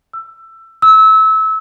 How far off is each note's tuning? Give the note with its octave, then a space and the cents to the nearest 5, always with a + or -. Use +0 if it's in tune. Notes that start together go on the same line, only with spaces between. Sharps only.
E6 +20
E6 -25